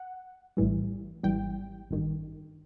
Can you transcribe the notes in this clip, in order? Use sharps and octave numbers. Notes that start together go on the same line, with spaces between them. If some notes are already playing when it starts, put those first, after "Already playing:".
Already playing: F#5
A#1 A2 E3 G3
G#1 G#2 E3 G3 G5
A1 G2 D#3